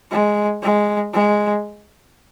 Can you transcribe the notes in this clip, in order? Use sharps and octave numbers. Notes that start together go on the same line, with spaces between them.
G#3
G#3
G#3